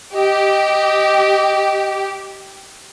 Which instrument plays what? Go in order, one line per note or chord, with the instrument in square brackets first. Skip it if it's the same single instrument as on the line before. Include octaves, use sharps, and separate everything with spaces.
[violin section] G4 [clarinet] D#5